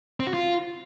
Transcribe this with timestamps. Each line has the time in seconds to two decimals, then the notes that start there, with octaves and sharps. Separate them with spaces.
0.20 C4
0.27 F#4
0.34 F4